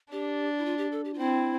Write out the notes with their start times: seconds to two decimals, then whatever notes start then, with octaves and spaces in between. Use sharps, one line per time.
0.11 D4 G4
0.58 E4
0.65 F4
0.78 G4
0.92 A4
1.05 G4
1.14 F4
1.19 C4 E4